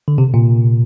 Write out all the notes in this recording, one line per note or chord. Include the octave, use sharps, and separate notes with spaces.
D3
C3
A#2